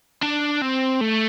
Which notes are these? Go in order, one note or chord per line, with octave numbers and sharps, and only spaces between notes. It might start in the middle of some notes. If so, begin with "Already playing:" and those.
D4
C4
A3